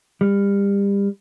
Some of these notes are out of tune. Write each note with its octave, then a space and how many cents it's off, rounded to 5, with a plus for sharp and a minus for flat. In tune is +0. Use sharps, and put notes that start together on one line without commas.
G3 +30